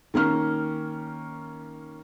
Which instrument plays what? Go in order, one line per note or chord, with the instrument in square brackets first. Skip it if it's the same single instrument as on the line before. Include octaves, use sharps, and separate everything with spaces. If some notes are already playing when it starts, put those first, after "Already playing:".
[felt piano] D#3 A#3 C#4 F6